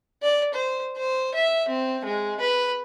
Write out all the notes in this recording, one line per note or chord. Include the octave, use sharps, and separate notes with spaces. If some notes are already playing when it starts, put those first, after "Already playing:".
D5
C5
C5
E5
C4
G#3
B4